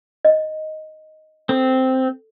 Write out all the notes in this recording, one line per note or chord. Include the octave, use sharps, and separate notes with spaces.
D#5
C4 A4